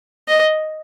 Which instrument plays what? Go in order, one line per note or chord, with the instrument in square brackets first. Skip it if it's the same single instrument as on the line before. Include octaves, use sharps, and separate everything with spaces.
[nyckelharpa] D#5